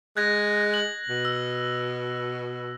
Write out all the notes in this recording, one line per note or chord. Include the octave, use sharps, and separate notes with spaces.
G#3 F#6 G#6 A#6
F#7
B2
E6